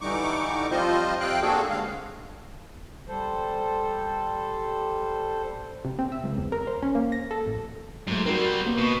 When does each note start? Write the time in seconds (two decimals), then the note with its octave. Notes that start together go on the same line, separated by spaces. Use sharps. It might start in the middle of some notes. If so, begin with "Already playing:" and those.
0.01 D3 E3 G3 D#4 C#6 D6
0.71 F3 G3 C4 F4 C5 D#5
1.20 F2 C3 C4 F5 G5 F#6
1.42 A#3 C4 D4 F#4 G#4 A4
1.70 D#2 D3 G#3 F5
3.08 G3 A4 C5
5.85 C3
5.99 C4
6.12 E5
6.24 C#2
6.38 E2
6.52 A#4
6.67 C5
6.83 C#4
6.95 A#3
7.12 A#6
7.31 A4
7.46 A1
8.08 G#2 F#3 A3
8.26 G3 C4 F#4 A#4
8.65 D2 A#3 B3
8.78 B2